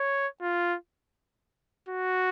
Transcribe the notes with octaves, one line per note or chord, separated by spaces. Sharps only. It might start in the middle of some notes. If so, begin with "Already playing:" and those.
Already playing: C#5
F4
F#4